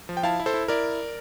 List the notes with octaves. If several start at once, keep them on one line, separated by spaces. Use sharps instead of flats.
F3
G5
E4 F5 A5
E4
A4 C5
E4
E4 A#4 D5